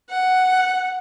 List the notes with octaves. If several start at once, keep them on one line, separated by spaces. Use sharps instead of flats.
F#5